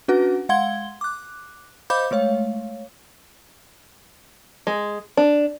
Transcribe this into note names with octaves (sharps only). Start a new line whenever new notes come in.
C#4 D4 F#4 B4 F#5
G#3 F5 F#5 C6 G#6 G7
D6 F#6
C5 D#5 F5 B5 D6 G6
G#3 A3 C#5 F5
G#3
D4